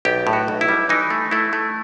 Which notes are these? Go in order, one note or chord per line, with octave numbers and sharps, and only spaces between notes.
B1 G4
A2
F#4
B1
E4
G3
E3 D#4
A3
A3 E4
A3